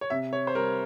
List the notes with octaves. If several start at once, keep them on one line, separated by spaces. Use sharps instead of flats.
C#5
C3 E5
C#5
C5
G3 A#4